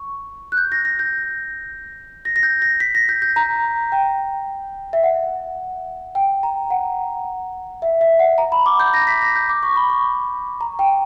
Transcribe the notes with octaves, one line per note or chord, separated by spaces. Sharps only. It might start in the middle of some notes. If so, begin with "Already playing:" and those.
Already playing: C#6
F#6
G6
A#6
A#6
G6
A#6
A#6
G6
A#6
B6
A#6
G6
G6
A#5
G5
E5
F#5
G5
A#5
F#5
E5
E5
F#5
A#5
B5
D6
G6
A#6
B6
A#6
G6
D6
C#6
B5
C#6
A#5
G5